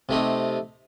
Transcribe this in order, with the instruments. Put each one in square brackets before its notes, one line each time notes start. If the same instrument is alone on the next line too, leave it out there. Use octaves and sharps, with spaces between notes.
[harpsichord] C3 A3 D#4